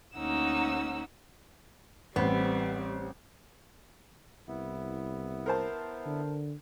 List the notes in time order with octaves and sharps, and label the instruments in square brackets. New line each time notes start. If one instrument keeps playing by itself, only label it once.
[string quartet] D2 A#3 C#4 D#4 F#5 E6
[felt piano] A1 C5 [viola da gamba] G3 C4 [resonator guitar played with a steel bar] B3
[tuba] C2 [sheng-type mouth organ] B3 E4
[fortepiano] A#4 C5 A5
[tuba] D3